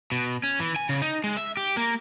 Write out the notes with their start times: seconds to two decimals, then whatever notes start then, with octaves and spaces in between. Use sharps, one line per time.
0.12 B2
0.43 C#4
0.60 E3
0.76 G#5
0.89 C#3
1.02 D#4
1.24 G#3
1.37 E5
1.57 G4
1.77 A#3